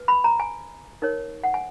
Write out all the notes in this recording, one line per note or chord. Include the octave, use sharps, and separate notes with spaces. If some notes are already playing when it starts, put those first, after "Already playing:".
Already playing: B4
B5
A#5
G#5
D#4 A#4 C#5
F#5
G#5